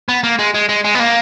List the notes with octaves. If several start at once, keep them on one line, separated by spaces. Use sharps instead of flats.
B3
A#3
G#3
G#3
G#3
G#3
B3
A#3